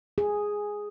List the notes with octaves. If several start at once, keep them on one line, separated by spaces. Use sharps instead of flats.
G#4